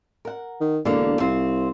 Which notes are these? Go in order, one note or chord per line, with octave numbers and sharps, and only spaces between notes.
A#4 F#5
D#3
E1 D3 A#3
C2 C4 F4